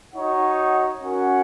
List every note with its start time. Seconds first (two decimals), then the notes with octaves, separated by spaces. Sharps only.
0.13 D#4 F#4 C#5 F#5
1.02 C#4 F#4 A#4 F#5